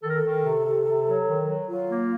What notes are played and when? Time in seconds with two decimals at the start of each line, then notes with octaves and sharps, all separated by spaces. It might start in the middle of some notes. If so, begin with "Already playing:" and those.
0.02 D#3 A4
0.10 A#4
0.17 A4
0.23 D#3
0.44 C3
0.65 C3
0.86 C3
1.07 F#3
1.27 D#3
1.48 F#3
1.69 F#3 F4
1.90 A#3